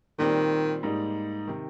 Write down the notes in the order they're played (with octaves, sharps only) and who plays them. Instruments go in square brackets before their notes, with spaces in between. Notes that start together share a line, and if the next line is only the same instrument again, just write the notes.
[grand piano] A#2 G3 C4 F4 [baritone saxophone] D#3
[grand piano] G#2 G3 A#3 D#4
C3 D#3